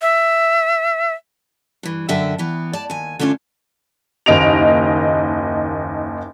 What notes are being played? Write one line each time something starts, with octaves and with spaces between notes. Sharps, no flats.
E5
G2 E3
F#2 D3 D5 E5 G5
E3 B3
D5 A5
D#2 G#5
D3 A3 C#4 D4 F4
F#1 D#2 D#5 D7 F7